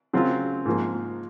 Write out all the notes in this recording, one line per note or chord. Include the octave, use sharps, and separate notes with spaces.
C#3 F#3 C4 F4
G#2 F3 A#3